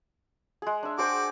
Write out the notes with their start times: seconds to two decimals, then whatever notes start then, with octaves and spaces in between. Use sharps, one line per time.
0.62 G#3 G#4
0.83 D4 E5
0.98 F#4 G#4 C5 G5 D6